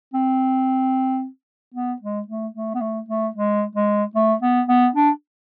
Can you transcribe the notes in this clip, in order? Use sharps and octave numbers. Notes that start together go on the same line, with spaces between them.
C4
B3
G#3
A3
A3
B3
A3
A3
G#3
G#3
A3
B3
B3
D4